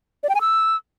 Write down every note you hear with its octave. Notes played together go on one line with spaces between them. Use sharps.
D5
G5
G#5
E6